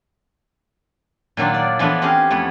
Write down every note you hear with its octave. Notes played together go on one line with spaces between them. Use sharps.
A#2 D#3 F#3 D4 F4
D5
E3 F3 B3 D4 E4 A4
C4 C#4 G4 G#4 F5
F2 A3 B3 E4